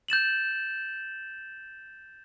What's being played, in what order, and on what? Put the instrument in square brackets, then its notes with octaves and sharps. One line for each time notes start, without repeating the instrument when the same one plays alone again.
[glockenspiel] G6 A6 E7 F#7